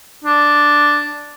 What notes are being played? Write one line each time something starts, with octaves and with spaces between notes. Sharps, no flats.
D4